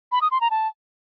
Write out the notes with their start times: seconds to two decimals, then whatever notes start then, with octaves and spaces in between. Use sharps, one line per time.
0.12 B5
0.22 D#6
0.31 C6
0.41 A#5
0.50 A5